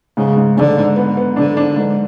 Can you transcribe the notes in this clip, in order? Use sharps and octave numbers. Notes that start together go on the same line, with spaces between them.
G#2 C#3
G#2
G#2 D3
G#2
B3
B3
D3 D4
D4
G#2